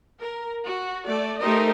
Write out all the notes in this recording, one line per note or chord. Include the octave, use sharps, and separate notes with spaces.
A#4
F#4
A3 D5
A3 D#4 G4 A#4 C5 D#5